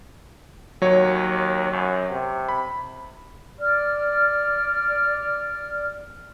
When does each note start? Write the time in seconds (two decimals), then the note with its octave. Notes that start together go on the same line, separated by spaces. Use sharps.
0.82 D#2 F#3 C#5
1.72 F#2
2.10 C3
2.49 B5
3.60 D5 F6